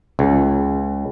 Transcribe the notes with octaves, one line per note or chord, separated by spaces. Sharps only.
C#2